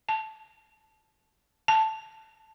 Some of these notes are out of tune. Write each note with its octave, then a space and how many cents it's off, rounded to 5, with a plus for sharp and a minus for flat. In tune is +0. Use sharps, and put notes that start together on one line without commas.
A5 -10
A5 +0